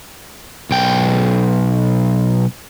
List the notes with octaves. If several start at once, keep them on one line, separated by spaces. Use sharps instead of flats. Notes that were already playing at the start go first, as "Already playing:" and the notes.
B1 G5